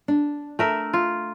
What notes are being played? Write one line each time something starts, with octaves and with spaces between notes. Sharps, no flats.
D4
A3 A#4 E5
F4